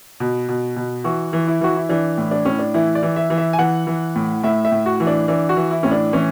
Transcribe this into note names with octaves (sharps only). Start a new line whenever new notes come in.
B2
B2
B2
E3 F#4
E3
E4
E3 F#4
E4
E3 D4
A2
D4
A2 C#4
D4
E3 E4
D5
E3
E5
E3
E5
G#5
E3 F#5
E3
A2
A2 E5
E5
A2
F#4
E3
D4
E3 D4
F#4
E3
E4
A2 C#4
D4
E3 C#4